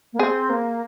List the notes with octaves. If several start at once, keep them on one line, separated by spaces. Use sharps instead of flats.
A#3
C4 G#4
A#3